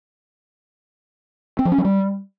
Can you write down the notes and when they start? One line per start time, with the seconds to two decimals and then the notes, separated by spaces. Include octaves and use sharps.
1.59 C4
1.65 F3
1.72 C#4
1.78 F#3
1.85 G3